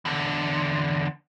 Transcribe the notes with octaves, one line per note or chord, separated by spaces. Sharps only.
E2 D3